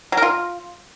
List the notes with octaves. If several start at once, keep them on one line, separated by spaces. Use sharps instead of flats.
F#3
A#4
F4